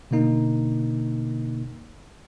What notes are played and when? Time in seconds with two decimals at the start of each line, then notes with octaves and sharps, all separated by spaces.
0.11 B2 D3 A#3 D#4